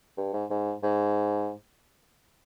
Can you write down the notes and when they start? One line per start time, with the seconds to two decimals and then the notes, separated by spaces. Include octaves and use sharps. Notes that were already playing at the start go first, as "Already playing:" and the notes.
0.17 G2
0.33 G#2
0.50 G#2
0.83 G#2